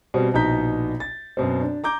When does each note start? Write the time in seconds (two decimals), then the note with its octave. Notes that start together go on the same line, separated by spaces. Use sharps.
0.14 B2 G3 C4
0.34 A#1 B2 D#4 A#5 G6 B6
1.00 A6
1.37 F#2 B2 C4
1.61 D4
1.84 A#5 D6 G6